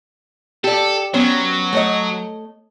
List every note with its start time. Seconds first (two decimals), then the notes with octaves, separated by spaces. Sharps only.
0.64 G4 A4 D5
1.14 F#3 B3 C#4 C5
1.73 A3 C#5 D#5